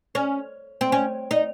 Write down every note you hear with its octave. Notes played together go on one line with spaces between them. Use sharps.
C#4
C4
C#4
D#4